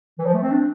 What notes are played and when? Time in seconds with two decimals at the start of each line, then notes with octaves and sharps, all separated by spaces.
0.19 E3
0.26 F3
0.34 A3
0.42 C4
0.51 D4